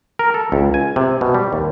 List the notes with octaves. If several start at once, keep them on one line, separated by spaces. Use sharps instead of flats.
A#4
A4
C#2
G#5
C3
B2
G3
D#2